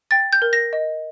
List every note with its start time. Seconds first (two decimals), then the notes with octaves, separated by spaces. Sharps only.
0.11 G5 A6
0.33 G6
0.42 A#4
0.53 A#6
0.73 D#5